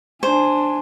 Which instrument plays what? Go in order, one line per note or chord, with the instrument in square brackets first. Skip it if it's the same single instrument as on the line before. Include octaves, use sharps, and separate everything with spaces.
[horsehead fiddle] D4 G#5 [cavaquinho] C5